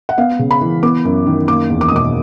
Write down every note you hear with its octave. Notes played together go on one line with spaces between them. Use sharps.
F#5
B3 F5
C#3
B5
E3
B3 D6
F#2
D#3
A#3 D6
E2
D6
D#6
B2 D6